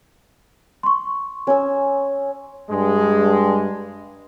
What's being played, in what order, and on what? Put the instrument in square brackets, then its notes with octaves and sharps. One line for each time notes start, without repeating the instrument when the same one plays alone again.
[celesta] C6 C#6
[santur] C#4 E6
[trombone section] G2 G#3